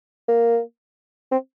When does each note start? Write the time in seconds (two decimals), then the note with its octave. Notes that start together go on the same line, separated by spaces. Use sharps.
0.28 A#3
1.32 C4